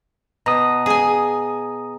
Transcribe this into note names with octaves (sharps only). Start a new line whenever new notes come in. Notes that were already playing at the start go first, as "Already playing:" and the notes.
B2 A#5 D#6
G#4 G#5